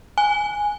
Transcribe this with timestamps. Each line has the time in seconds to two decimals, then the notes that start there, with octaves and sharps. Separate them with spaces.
0.18 G#5